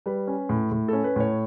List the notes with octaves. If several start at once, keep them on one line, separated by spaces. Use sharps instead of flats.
G3 B4
C#4
A2
A2
C#4 A4
B4
A2 C#5